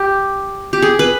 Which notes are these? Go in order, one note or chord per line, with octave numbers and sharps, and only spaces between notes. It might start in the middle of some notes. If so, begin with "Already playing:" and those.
Already playing: G4
G4
G#4
B4